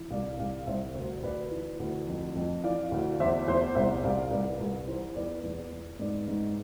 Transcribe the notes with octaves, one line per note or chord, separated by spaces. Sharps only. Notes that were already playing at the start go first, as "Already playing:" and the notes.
Already playing: E3
C2 D5 F5
C2 D5 F5
C2 C5 E5
D2 C5
D2 B4 D5
E3
D2
F2
F2
E3 D5 F5
D2
E2 C5 E5
E2 C5 E5
C2 C5 E5
C2 D5 F5
C2 B4 D5
C2
E3 C5
E2 B4 D5
E2
E2
G#2 B4 D5
G#2